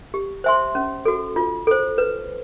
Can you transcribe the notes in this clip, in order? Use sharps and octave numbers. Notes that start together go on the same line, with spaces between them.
G4
C5 E5 G#5 C6
C#4
F#4 A4
F4
A4 C5
B4